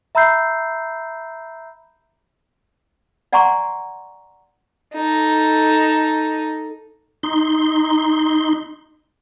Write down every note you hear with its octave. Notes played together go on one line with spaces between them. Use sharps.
E5 A#5 B5 E6 G6 C7
D5 F#5 G#5 A#5 C6 C#6
D#4 A4
D#4 C6